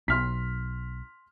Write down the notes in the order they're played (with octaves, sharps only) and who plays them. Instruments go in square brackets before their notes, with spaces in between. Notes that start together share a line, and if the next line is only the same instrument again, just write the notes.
[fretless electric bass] B1 [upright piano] C6 F6 B6